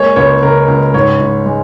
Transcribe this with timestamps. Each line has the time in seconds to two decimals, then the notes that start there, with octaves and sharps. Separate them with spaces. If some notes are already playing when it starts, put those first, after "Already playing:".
Already playing: G#3 A#3 C#5
0.16 C#2 C#5
0.42 C#3 A#4
0.68 C#2
0.94 G#2 C#5
1.20 G#2
1.46 G#3